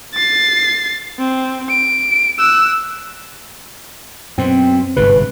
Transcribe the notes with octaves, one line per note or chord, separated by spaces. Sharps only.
A6 C7
C4
D7
E6 F#6
F#2 B2 C4
G1 G#2 C3 B4